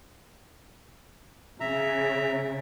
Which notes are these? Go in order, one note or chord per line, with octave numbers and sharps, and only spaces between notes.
C#3 E5 A#5